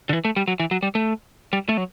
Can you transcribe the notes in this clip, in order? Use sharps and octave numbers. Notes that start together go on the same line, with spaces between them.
D3
E3
A3
G3
F#3
E3
F#3
G3
A3
G3
A3
F#3